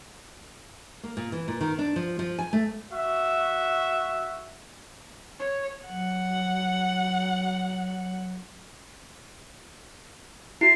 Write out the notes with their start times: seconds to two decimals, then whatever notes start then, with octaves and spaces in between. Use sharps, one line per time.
1.03 A#3
1.17 A#2
1.32 E3
1.48 A#2
1.61 D#3
1.79 D4
1.96 F3
2.19 F3
2.39 G#5
2.53 A3
2.91 F#4 E5
5.39 C#5
5.88 F#3 F#5
10.61 E4 F#4 C7